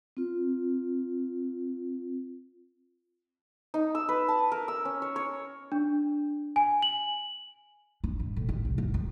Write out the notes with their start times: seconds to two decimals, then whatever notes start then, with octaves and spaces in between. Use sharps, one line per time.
0.17 C4 F4
3.74 D#4
3.95 E6
4.09 B4
4.28 A5
4.52 A#4
4.68 E6
4.85 C#4
5.02 C#5
5.16 C#5
5.72 D4
6.56 G#5
6.82 F#7
8.04 D4
8.19 G#2
8.36 A2
8.49 G1
8.65 C2
8.78 G#2
8.94 F#2